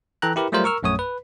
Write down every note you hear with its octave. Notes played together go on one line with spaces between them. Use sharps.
E3 A4 G5 A#5 F#6
E4 G4 A#4 B4
F#3 G3 A3 F4 A#4 C5
A#4 C#6 E6 F6
A#1 F#2 A3 C#5 D#6
B4